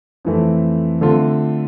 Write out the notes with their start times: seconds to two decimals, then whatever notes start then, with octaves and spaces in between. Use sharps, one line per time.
0.25 F2 E3 A3 C4
1.01 D3 A3 C4 F4